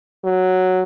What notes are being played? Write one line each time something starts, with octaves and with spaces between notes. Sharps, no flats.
F#3